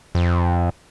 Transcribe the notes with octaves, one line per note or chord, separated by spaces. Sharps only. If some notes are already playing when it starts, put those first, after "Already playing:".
F2